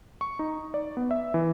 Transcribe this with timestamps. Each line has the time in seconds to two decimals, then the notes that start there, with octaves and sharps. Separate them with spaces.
0.21 C#6
0.39 D#4
0.74 D5
0.97 B3
1.11 E5
1.34 E3